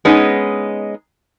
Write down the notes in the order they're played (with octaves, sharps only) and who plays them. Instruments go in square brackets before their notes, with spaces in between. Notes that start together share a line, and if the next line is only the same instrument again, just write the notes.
[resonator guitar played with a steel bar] G#3 B3 C#4 D#4